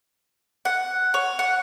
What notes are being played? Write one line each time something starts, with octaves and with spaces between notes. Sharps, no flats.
F#5
C#5
F#5